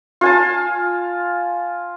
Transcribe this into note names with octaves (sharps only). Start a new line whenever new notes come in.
F4 G#5 A5